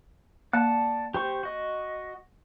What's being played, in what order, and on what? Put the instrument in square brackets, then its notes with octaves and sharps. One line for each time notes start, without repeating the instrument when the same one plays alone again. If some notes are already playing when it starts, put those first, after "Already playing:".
[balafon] A#3 [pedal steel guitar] D5 F#5 A5
[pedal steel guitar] G4 C5 C#6
F#4 D#5